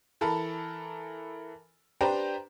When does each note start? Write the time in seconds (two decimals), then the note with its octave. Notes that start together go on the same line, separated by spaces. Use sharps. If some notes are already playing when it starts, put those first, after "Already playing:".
0.21 E3 A4 A#4 A5 B5
2.01 D4 G4 B4 C5 G5 A#5